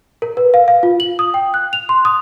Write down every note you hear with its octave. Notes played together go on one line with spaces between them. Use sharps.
A#4
B4
F5
F5
F4
F#7
D#6
G5
F#6
F7
C6
D#6